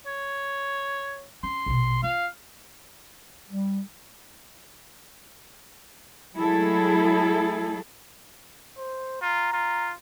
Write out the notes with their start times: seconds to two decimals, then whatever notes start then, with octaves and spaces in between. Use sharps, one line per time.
0.06 C#5
1.43 C#4 C6
1.66 A#1 B2
2.03 F4 F5
3.49 G3
6.35 F#3 G#3 A3 E4 G#4 A4
8.77 C5
9.22 F4 A#5
9.53 F4